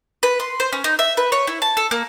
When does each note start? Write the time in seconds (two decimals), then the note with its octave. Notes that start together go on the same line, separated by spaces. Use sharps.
0.23 B4
0.40 C6
0.60 C5
0.73 C#4
0.84 D#4
0.99 E5
1.17 B4
1.32 C#5
1.47 E4
1.62 A5
1.77 A4
1.91 A#3